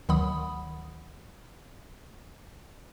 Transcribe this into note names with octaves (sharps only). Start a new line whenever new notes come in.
D2 D#3 F#3 F#5 B5 D#6